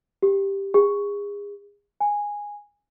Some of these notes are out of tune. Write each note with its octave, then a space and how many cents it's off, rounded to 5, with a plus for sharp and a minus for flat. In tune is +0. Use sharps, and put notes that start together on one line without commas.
G4 +5
G#4 -35
G#5 -10